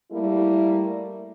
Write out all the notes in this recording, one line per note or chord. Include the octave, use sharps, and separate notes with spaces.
G3 A3 A#3 E4